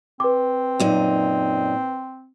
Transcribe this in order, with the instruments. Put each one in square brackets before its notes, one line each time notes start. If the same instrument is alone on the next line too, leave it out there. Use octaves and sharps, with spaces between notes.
[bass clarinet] C4 [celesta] B4 D6
[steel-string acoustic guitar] F#2 A#2 D#4